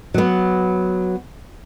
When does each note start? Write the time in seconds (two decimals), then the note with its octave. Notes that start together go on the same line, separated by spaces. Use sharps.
0.14 F#3 B3